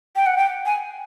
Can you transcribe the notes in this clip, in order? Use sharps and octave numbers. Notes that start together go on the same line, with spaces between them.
G5
F#5
G5
G#5